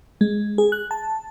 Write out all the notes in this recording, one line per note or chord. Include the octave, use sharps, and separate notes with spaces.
G#3
G#4
F#6
A5